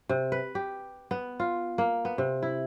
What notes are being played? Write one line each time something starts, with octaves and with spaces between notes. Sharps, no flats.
C3
B4
G4
B3
F4
A#3
B3
C3
E4